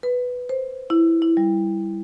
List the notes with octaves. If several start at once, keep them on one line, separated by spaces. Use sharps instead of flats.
B4
C5
E4
E4
G3